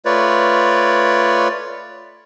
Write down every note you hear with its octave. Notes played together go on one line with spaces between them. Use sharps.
A3 F4 B4 C#5 D5